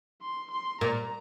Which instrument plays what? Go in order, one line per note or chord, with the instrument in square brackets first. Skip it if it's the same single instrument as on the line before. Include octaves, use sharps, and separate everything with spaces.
[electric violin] C6
C6
[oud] A#2 [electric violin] A#5